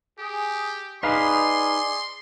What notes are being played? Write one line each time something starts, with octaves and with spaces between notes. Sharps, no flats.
G4 G#4
D#4 G#4 B4 D5 F5 C6